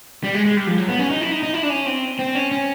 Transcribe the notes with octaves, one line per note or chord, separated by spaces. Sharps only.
G3
G#3
G#3
G3
F3
F#3
B3
C#4
D#4
E4
D#4
D#4
E4
D4
C#4
C4
C4
C#4
C#4